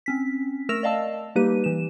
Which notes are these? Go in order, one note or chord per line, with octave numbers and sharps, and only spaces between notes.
C4 C#4 B6
A3 A#4 E6 A#6 E7 F7
D5 D#5 F5 A5 E6
G3 A#3 D#4 G4 B4 D#7
E3 E7